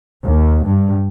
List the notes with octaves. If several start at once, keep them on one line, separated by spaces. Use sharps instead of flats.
D#2
G2